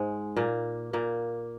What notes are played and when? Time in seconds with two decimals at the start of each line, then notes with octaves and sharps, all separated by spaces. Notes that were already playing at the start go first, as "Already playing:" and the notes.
Already playing: G#2 G#3
0.37 A#2 A#3
0.93 A#2 A#3